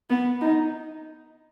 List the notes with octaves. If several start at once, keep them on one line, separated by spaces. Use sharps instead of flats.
B3
D#4